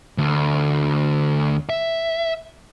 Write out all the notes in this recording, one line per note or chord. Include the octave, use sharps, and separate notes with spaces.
D2
E5